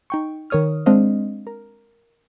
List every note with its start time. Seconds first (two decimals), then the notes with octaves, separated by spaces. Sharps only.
0.10 D#4 G5 C#6
0.50 D#3 A#4 C#5 D#6 F6
0.86 G#3 C4 D4 C5 D#5 F5
1.47 A#4